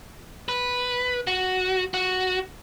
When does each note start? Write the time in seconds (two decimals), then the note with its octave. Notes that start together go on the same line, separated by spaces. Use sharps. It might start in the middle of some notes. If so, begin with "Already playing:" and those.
0.49 B4
1.27 F#4
1.94 F#4